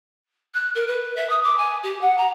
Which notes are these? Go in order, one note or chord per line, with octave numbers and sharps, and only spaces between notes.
F#6
A#4
B4
E5
D#6
D6
G#5
G4
F#5
A#5